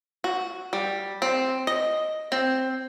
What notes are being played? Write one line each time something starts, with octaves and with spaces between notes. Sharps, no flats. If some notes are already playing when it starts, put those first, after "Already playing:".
F#4
G3
C4
D#5
C4